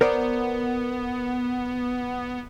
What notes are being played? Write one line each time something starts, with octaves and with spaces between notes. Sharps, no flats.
B3 A#4 C5 D5